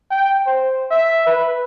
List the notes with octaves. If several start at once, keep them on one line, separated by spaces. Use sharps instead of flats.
G5
C5
E5
B4